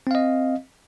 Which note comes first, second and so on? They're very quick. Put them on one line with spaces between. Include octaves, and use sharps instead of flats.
C4 F5 D#5